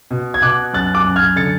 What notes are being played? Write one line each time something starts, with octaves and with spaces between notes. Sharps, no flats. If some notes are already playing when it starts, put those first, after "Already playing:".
B2
G#6
B2 D6 F#6
F#2 F#6 A6
D6 F#6
F#2
F6 G#6
D3 A6 C#7